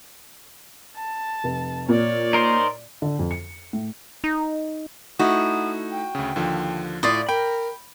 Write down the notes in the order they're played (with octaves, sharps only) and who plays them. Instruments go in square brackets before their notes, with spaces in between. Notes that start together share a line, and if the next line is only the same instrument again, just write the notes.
[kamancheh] A5
[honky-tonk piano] F1
[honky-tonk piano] A#2 [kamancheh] C#5 D5
[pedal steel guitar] D#4 A#4 C5
[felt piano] D3
F2
C#7
A2
[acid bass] D#4
[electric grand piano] A3 D#4 E4 [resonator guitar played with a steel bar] F#4 [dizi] D#6
[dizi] G5
[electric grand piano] D2 C#3
D#2 D3 F3
[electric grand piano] A2 [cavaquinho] F4 D5 D#6
[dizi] A#4 [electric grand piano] G5 [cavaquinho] B5